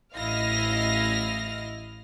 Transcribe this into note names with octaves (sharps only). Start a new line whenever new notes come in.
A1 E4 D#5 F5 F6 A#6